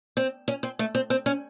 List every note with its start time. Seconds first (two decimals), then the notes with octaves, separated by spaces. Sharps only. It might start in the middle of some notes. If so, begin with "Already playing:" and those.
0.17 C4
0.48 C#4
0.63 C4
0.79 A3
0.95 C4
1.10 C4
1.26 C#4